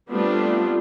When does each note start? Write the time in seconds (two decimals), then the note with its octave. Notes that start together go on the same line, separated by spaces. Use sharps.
0.10 G3 A3 B3 C4 D4 F4